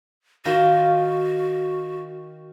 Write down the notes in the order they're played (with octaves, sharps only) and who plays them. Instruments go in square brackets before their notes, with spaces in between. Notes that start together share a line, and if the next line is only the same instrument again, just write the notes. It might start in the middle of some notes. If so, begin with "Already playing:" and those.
[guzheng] D#3 D#4 F4 [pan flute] F#4